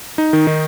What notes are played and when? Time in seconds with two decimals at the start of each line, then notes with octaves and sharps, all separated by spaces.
0.18 D#4
0.33 D#3
0.47 D#3